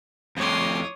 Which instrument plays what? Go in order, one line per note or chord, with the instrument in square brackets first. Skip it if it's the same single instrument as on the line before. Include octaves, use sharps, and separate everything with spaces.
[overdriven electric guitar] F2 A2 [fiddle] C#5 D#6 [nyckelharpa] C6 D6